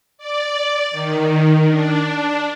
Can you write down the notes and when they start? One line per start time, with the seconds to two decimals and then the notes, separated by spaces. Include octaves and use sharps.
0.18 D5
0.91 D#3
1.68 D4